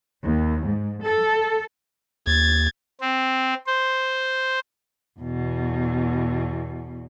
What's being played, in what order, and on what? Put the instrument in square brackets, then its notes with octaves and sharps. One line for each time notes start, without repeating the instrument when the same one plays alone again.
[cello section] D#2
G#2
A4
[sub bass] D#2 [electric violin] G#6 A6
[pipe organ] C4
C5
[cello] E2 B2